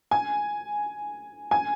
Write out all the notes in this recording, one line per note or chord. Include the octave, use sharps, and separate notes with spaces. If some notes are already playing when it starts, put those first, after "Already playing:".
G#5
G#5